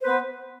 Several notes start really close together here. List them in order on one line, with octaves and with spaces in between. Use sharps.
C5 B4 B3